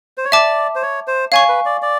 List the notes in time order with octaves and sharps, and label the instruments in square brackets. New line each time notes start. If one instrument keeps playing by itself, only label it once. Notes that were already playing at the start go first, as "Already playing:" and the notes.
[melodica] C5
C#5
[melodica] D5 [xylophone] E5 A5 D6
[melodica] C5
C#5
C5
[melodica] C#5 [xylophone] F5 G#5 C#6
[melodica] B4
D5
D5